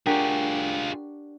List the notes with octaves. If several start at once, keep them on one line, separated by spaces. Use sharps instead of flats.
D4 F4 G4 G#4 A#4 F#5 C#6